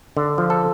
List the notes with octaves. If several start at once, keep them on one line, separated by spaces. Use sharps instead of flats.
D3
F3
A4